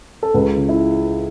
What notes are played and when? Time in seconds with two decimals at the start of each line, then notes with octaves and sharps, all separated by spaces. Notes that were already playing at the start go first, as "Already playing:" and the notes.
0.23 A4
0.34 C#2 B4
0.56 C#3
0.69 E4